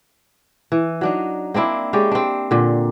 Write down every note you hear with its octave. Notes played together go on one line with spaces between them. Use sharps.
E3
F#3 D4 D#4
A#3 C4 D4 E4
G#3 C#4 G4 D5
C4 D4
A#2 D3